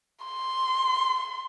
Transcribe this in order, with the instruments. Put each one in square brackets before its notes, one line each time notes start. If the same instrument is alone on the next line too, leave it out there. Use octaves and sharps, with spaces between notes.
[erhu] C6